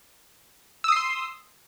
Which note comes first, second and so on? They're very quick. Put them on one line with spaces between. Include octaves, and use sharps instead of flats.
E6 D#6 C7 C6